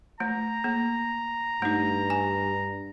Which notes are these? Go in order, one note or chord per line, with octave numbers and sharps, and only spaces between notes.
A3 A#5
A#3
G2 A3 D#4
G#5